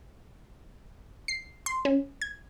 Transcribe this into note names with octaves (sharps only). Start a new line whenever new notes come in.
C7
C6
C#4
G#6